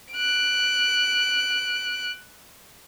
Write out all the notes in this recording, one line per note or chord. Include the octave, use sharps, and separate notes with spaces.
F#6 D7